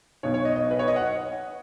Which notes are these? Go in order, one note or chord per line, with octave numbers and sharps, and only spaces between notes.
B1 B2 F#3 C#5
C#5
D#5
D#5
B4
C#5
D#5
F#5